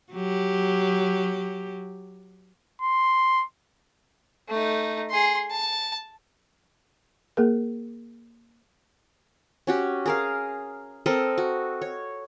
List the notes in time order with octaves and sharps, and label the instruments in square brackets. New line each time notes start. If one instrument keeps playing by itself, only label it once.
[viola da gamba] F#3 G4
[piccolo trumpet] C6
[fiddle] A3 D#4
G#4 C6
A5
[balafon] A#3 G#4 A#4
[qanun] C#4 F#4 G4
G#4 A#4 F5
C4 A4 A#4 D#5
F#4
C#5